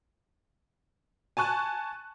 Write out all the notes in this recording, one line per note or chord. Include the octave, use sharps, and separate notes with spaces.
G#5 A5 C#6 F#6